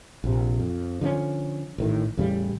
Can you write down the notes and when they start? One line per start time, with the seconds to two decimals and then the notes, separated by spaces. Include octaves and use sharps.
0.24 A#1 C3
0.60 F2
1.01 D3 F3 A#3 C#4
1.78 A1 A2 D#3
2.17 A1 E2 C#3 G3